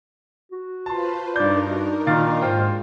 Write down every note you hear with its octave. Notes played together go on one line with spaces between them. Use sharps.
F#4
F4 B4 C5 A5 C6
G2 D4 D#4 A#4 D5 G6
F#4
A#2 D#3 F5 A6
G#2 F4 C5 G5